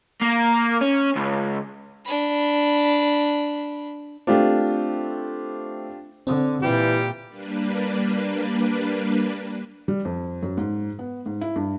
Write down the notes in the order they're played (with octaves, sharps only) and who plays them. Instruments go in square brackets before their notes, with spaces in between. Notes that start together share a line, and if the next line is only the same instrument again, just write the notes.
[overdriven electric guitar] A#3
C#4
C#2
[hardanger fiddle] D4 B5
[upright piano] A3 C4 [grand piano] D4 F4 G4
[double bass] D3 [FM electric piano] C4
[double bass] A#2 [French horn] E3 [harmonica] G3 G4
[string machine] G3 A#3 D4 B4
[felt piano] G3
F2
F#2
G#2
B3
G#2
E4
G2